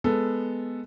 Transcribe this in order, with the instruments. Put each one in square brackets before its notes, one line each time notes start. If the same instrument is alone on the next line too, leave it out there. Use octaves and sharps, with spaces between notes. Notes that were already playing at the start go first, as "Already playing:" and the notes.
[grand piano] G#3 B3 A4